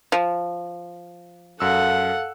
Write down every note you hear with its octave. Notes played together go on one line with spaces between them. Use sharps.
F3
F#2 A4 F5 F#5 E6